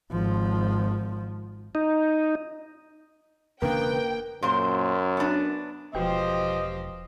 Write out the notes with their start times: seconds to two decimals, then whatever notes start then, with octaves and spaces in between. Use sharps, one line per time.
0.12 G#1 F3
1.75 D#4
3.62 E1 C#3 A#3 D4 B4 G5
4.43 F#2 A#2 C5
5.17 B3 D4
5.95 E1 F3 F#4 G4 B4 C5 D#5 G5